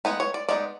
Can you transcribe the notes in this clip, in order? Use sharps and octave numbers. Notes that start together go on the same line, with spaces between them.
G#3 B3 D#4 B4
C#5
D5
G#3 B3 D#4 D5